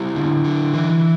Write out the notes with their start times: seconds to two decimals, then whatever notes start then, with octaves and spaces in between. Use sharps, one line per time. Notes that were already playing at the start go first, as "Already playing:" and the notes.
Already playing: G3 E4
0.16 D3
0.44 D3
0.74 E3